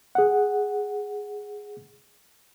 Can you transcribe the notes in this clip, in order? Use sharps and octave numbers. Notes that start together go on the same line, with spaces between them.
G#4 F#5